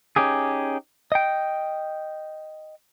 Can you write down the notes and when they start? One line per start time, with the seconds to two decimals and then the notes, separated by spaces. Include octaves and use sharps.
0.16 C#4 D#4 G4 G#4
1.12 D#5 G5